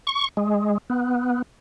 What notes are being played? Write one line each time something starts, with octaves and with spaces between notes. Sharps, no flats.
C#6
G#3
B3